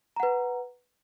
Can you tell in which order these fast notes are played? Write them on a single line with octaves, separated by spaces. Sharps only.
A#5 F#5 B4